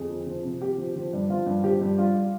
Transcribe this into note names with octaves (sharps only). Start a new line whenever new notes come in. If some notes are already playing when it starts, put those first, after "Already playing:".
Already playing: F2 G#4
F3
F3
C3
F3 G4
F3
F3
G2
F3 F4
G2
F3 G4
G2
G3 F4
G3